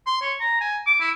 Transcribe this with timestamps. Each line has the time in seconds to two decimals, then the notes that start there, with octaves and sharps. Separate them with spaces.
0.06 C6
0.22 C#5
0.41 A#5
0.61 G#5
0.87 D6
1.00 E4